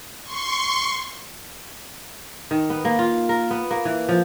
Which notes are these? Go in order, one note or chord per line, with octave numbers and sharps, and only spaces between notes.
C6 C#6
D#3
B3
A#3
F4
A#4
B3
A#3
E3
F3